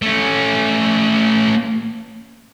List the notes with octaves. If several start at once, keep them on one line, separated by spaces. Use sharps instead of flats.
A3 C#4